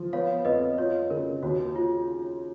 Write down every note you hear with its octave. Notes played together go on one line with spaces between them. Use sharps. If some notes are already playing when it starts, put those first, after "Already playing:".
Already playing: F3
B3 C#5 F5
F2 B4 D#5
F4 C#5
C#3 A#4
D#2 F#4
F4